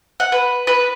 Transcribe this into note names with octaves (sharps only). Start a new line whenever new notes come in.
F#5
B4
B4